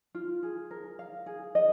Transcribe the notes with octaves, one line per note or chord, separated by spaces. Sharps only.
F4
G#4
A#4
F5
G#4
D#5